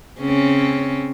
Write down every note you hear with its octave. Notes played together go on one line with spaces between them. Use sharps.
C#3 C4 C#4